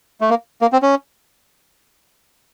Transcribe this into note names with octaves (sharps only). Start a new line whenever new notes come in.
A3
A#3
A#3
C4
C#4